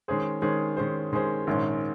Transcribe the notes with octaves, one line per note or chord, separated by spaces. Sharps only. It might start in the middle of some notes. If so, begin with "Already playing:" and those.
D#3 G#3 C#4 G#4 C5
D#3 G#3 C#4 G#4 C5
D#3 G#3 C#4 G#4 C5
D#3 G#3 C#4 G#4 C5
A#1 G#2 D#3 G#3 C#4